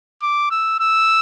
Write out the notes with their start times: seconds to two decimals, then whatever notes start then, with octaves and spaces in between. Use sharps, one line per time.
0.22 D6
0.51 E6
0.80 E6